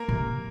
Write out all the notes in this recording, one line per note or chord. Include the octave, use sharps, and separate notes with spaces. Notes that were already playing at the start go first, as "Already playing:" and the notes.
Already playing: A#3 A#4
C3